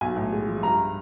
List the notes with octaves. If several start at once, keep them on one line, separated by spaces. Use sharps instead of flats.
B1 G#5
A2
G#3
F3
G2 A#5